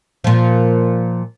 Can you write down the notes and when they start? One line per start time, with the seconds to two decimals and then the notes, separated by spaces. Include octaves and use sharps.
0.24 A#2 F3